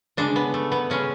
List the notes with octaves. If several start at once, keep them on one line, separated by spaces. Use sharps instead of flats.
C#3 G#3 D4
B3
A3
B3
C#3 G#3 C#4